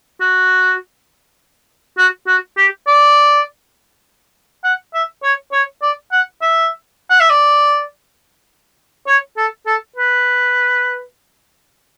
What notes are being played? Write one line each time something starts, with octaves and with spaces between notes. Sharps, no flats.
F#4
F#4
F#4
G4
D5
F#5
E5
C#5
C#5
D5
F#5
E5
F#5
E5
D5
C#5
A4
A4
B4